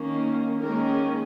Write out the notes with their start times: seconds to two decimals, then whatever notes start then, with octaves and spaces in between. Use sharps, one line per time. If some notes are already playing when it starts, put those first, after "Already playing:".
Already playing: D#3 A#3 C#4
0.61 D#3 G#3 A#3 C#4 A#4